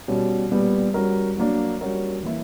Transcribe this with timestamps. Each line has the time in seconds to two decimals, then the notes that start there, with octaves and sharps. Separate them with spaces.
0.08 B2 G3 C#4
0.51 A#2 G3 B3
0.94 G3 C#4 F#4 A#4
1.37 F#3 A#3 D4
1.81 G3 C#4 F#4 A#4
2.23 E3 A#3 E4